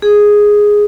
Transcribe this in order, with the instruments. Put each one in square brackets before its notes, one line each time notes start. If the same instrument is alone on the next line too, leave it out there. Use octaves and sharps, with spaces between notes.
[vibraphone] G#4